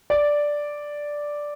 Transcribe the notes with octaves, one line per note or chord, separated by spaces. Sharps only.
D5